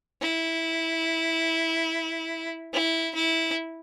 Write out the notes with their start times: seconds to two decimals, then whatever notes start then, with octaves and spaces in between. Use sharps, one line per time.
0.22 E4
2.73 E4
3.15 E4